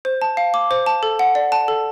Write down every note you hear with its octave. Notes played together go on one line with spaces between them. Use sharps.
C5
A5
F5
D6
C5
A5
A4
F#5
D5
A5
A4